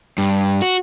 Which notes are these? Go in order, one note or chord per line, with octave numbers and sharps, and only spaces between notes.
G2
F#4